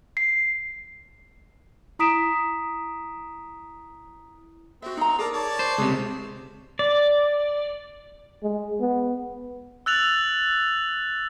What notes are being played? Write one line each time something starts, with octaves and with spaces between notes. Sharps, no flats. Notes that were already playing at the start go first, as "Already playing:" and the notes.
C7
E4 A#5 D#6 B6 D7 E7
C4 F#4 E5
D#4 A#5
G#4 A#4 D5 A5 A#5
C#5 D5 A5
C5
C#2 C3 G#4 B4
D5
G#3
B3
E6 F#6 A6 F7 F#7